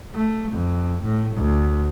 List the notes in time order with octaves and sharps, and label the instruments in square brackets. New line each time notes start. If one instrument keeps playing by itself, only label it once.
[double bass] A3
F2
A2
D2